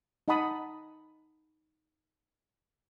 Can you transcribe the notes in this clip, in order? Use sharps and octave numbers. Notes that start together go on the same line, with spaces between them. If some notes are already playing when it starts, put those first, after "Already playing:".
D#4 D#5 F#5 A5 B5 D#6